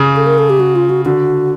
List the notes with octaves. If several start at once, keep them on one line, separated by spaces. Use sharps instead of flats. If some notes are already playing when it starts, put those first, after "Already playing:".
Already playing: C#3
A4
A#4
A4
G4
F#4
F4
F#4
D3 F#4